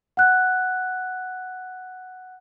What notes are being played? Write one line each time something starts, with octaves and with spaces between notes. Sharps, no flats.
F#5 F#6